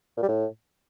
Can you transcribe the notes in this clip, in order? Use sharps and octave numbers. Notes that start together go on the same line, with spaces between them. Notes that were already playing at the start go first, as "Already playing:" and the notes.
A#2
G3
A2